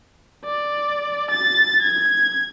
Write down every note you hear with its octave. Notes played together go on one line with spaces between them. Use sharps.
D5
A6
G#6